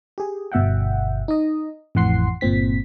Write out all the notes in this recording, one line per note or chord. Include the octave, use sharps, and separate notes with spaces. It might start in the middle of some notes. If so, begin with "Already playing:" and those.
G4 G#4
G1 B2 E5 F#5 G5
D#4 D#5
A1 F2 E3 F#5 C6 C7
G1 A#2 C4 B6